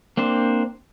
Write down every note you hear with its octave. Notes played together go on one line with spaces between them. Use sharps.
A#3 C4 D4 C5